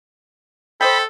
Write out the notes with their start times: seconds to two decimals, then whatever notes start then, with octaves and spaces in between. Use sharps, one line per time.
0.81 A4 C5 D#5 G5 B5